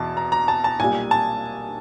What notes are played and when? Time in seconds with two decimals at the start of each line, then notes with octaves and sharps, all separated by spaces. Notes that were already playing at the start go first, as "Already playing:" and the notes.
Already playing: E2 B2 A5
0.17 A#5
0.32 A#5
0.48 A5
0.64 A5
0.79 B1 A#2 G3 G#5
1.11 A5